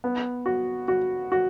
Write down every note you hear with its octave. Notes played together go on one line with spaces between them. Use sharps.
B3
F#4
F#4
F#4